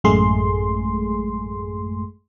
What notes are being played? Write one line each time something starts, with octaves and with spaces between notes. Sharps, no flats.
A1 F#2 G#3 A3 G#4 C6